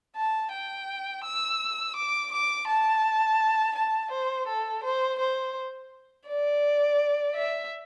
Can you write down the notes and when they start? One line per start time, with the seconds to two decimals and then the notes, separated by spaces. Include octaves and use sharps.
0.16 A5
0.52 G5
1.24 E6
1.96 D6
2.32 D6
2.68 A5
3.76 A5
4.11 C5
4.47 A4
4.84 C5
5.20 C5
6.28 D5
7.36 E5